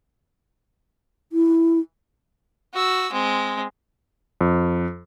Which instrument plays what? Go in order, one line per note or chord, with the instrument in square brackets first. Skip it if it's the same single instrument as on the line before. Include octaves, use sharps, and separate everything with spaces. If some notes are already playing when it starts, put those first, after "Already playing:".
[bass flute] E4
[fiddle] F#4 E6
G#3 C4
[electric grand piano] F2